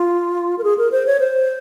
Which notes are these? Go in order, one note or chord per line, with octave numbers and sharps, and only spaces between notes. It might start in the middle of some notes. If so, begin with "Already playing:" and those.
Already playing: F4
A#4
G#4
A#4
C5
C#5
C5